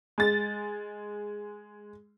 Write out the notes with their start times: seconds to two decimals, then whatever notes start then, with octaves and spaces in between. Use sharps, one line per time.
0.18 G#3 A6